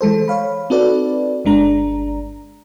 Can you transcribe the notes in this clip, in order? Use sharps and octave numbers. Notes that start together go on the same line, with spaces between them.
E3 G#3 A4 C5
C#5 F5 B5
C4 D#4 F#4 A4 B4 D5
G1 G#3 D4 A#5